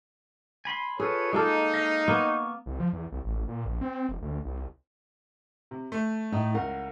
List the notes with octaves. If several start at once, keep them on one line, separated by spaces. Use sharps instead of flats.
G#5 B5 C6
F4 G#4 A4 B4 C#5
G#3 A#3 D#4 A4
D#5 F5
A#3 B3 C#6
C2
F3
E2
C2
A1
A#2
A#1
C4
E1
D2
C2
C3
A3
A2 D#4
C#2 A#4 F#5